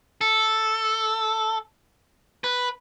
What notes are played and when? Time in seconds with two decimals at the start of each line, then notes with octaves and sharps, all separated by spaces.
0.21 A4
2.44 B4